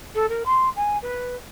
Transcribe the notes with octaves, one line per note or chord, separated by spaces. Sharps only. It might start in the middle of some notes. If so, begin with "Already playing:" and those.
A4
A#4
C6
G#5
B4